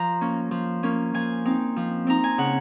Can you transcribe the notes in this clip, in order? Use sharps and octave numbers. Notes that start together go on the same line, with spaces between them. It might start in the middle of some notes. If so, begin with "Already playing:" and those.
Already playing: F3 A#5
A#3 C#4
F3
A#3 C#4
F3 G#5
C4 D#4
F3
C4 D#4 A#5
G#5
C#3 F#5